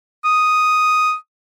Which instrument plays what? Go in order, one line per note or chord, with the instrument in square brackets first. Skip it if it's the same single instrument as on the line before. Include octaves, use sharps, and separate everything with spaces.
[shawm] D#6